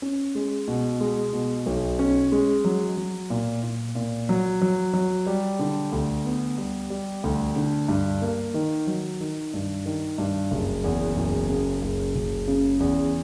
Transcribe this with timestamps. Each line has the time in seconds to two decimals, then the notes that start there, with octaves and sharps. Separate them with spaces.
0.02 C#4
0.35 G#3
0.68 B2
1.01 G#3
1.33 B2
1.66 B1
1.99 C#4
2.32 G#3
2.64 F#3
2.97 F#3
3.30 A#2
3.63 A#2
3.95 A#2
4.29 F#3
4.61 F#3
4.94 F#3
5.26 G3
5.59 D3
5.92 D2
6.25 B3
6.58 G3
6.90 G3
7.24 D2
7.56 D3
7.88 G2
8.22 A#3
8.54 D#3
8.87 F#3
9.20 D#3
9.54 G2
9.86 D#3
10.18 G2
10.51 F#1
10.84 E2
11.17 F#1
11.49 C#3
11.82 F#1
12.15 F#1
12.47 C#3
12.80 E2